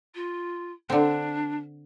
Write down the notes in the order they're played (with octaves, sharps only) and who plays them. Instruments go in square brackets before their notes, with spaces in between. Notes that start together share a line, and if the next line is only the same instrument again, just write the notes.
[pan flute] F4
[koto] D3 C4 [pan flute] D4